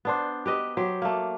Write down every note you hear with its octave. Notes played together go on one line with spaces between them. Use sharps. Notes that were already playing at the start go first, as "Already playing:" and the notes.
B3 D4 C5
G4 B4 D#5
F#3 G4 C5
A3 A#3